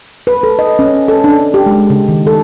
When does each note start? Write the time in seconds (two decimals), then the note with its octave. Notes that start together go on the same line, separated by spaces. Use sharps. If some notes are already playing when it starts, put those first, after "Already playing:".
0.27 B4
0.43 A4
0.59 D#5
0.79 C#4
1.08 A4
1.24 D4
1.54 G4
1.66 G#3
1.90 C#3
2.08 D#3
2.27 A4